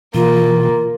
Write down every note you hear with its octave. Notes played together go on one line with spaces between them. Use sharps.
B2 E3 A#3 F4